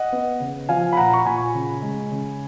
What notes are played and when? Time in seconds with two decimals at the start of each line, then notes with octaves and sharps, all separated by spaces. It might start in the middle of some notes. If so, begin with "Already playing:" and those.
Already playing: D#5 F#5
0.12 B3
0.40 C#3
0.68 F3 F5 G#5
0.93 B5
0.97 A#2 F#5 A#5
1.13 C#6
1.26 A#2 G#5 B5
1.54 C#3
1.82 G#3
2.11 C#3